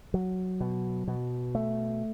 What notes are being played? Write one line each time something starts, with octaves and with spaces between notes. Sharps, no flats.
F#3
B2
B2
A3